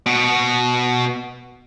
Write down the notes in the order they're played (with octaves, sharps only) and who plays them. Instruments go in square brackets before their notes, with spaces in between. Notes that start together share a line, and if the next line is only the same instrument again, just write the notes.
[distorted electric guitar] B2 F#4